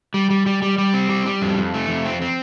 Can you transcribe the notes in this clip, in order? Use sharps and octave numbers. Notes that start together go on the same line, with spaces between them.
G3
G3
G3
G3
G3
C4
G3
G3
F2
F2
A3
F2
C4
C4